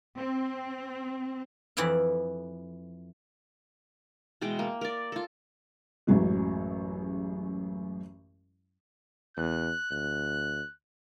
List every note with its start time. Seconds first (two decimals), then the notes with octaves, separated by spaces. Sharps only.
0.17 C4
1.77 F2 E3 E4 D5 F5
4.41 B2 E3 G#3 G5
4.59 A#3
4.81 A#4 D5
5.12 F4 A4
6.07 A1 F#2 F#3 G#3
9.37 E2 F#6
9.91 D2 F#6